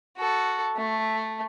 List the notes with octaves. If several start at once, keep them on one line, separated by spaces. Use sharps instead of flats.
F#4 A4
A3